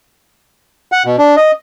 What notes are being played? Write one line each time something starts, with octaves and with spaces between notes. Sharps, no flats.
F#5
B2
D4
D#5